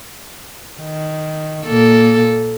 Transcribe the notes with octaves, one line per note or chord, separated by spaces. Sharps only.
D#3
A#2 A#3 A4